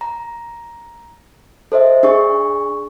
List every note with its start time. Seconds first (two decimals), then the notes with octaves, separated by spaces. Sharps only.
0.01 A#5
1.72 A4 C5 D#5 E5
2.03 D4 G#4 C#6